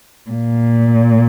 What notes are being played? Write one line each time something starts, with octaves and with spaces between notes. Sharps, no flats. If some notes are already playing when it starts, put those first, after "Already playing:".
A#2